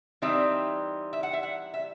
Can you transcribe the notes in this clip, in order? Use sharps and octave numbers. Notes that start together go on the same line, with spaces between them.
E3 G3 C4 D#4 E5
E5
F#5
E5
F#5
E5